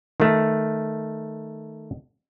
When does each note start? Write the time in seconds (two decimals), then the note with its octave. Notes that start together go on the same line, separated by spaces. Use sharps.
0.20 D#3 A3